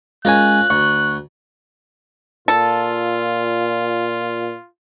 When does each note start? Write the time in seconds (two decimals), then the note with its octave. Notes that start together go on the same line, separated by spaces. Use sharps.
0.25 G#3 C#4 F4 A#4 C#5 G#5 F#6
0.70 D2 C#6
2.48 A#2 F4 A4